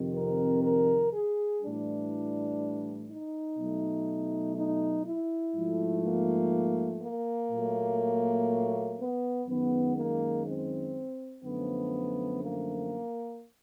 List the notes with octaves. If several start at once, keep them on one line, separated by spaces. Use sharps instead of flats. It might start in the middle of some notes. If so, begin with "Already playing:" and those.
Already playing: F2 C3 D#3
A#4
A#4
G#4
A2 E3 G3 D4
D#4
B2 F#3 A3
D#4
E4
G#2 F3 A3
A#3
A#3
A#2 F#3 A3
B3
F#2 D#3 G#3 B3
A#3
C4
F#2 D3 F3 A3 B3
A#3